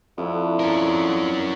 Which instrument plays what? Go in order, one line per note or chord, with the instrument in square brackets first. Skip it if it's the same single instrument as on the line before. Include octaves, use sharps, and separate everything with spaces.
[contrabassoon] F2 [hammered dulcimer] D3 E4
[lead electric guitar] C#4 A#4